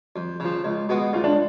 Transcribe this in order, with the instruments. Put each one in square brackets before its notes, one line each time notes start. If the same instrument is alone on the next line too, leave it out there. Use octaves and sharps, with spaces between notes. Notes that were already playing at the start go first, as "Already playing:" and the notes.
[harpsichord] F2
C#3 F3
C#2
B2 G#3 B3 F#4
[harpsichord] C#2 [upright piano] F4
[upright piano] D4